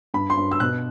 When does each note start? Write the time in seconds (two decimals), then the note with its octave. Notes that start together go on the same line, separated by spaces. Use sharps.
0.14 G2 B5
0.30 C6
0.37 G2
0.51 E6
0.60 B2 F#6